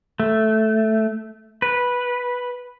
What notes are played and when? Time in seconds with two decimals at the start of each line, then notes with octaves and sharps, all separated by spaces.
0.20 A3
1.62 B4